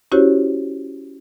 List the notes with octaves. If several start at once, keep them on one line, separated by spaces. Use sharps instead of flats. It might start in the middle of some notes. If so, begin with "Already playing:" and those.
C#4 E4 F#4 G4 C5 C#5